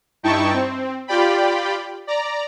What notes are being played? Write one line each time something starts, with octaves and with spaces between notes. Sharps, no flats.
G2 D#4 E4 G5 A5 C#6
C4
F4 G4 D5 G5 B5
D5 A#5